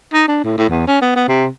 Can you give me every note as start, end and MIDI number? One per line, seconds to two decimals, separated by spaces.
0.14 0.24 63
0.28 0.39 62
0.44 0.53 45
0.58 0.69 45
0.69 0.87 40
0.88 1.00 61
1.01 1.13 59
1.16 1.26 59
1.28 1.47 48